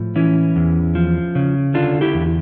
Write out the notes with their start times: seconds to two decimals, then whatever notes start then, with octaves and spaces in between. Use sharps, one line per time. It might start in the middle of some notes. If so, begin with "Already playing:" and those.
Already playing: A2 F3
0.16 E3 C#4 E4
0.56 E2
0.95 F3
1.35 C#3
1.74 D3 D4 F4
2.01 E4 G4
2.14 E2